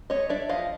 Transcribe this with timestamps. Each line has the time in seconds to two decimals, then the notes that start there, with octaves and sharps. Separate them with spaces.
0.10 A3 C#5 D#5
0.30 D4 D5 E5
0.49 F3 D#5 F5